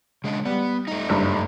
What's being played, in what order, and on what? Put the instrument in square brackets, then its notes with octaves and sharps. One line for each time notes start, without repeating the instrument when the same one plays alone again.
[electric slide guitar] C#3 G#3 D4
[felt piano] G3 [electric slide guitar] B3
[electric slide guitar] A3 D#4
[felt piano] F#1 G2